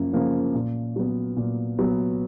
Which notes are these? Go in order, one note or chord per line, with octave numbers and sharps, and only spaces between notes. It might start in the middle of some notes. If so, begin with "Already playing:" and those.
Already playing: F#2 C#3 F3 A#3 C#4
C#3 F3 A#3 C#4
A#2
F#3 B3
A#2
F#3 B3